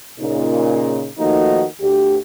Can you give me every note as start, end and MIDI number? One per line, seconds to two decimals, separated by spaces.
0.20 1.08 46
0.20 1.08 49
0.20 1.08 63
1.18 1.64 51
1.18 1.64 53
1.18 1.64 57
1.18 1.64 58
1.18 1.64 63
1.18 1.64 66
1.81 2.16 38
1.81 2.16 67